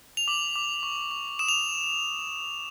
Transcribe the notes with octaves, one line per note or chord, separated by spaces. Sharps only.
F7
D6 F#7
D6
C#6
C#6
D#6 E7
F7